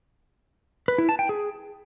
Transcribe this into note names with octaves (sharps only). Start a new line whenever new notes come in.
B4
E4
A5
G5
G#4